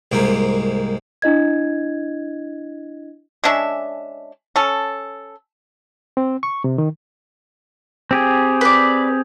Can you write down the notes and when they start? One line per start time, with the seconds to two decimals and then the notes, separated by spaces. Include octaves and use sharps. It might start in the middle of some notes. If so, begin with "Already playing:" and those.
0.12 C2 G#2 A#3
1.22 D4 E4 D#5 G#6
3.44 G#3 C#4 D4 E5
4.56 C#4 A4
6.17 C4
6.43 C#6
6.64 C3
6.78 D#3
8.11 C4 G4 G#4
8.61 B4 D5